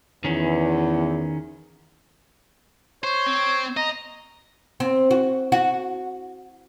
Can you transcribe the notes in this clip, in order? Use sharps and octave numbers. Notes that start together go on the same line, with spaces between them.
E2 D#3 C#4
C5 C#5
C4
D#5 A#5
C4
F#4
F#4